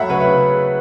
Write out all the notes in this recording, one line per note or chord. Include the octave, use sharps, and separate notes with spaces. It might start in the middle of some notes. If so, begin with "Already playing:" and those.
Already playing: F#3 A3 E5 F#5 B5
C#3 B4 C#5
B4 C#5
C#3